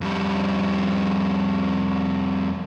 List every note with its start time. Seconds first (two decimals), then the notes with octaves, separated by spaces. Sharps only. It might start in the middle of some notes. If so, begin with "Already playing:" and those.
0.01 F2 G3